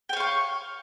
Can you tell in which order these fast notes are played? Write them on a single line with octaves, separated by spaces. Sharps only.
G5 C#5 F5 C#6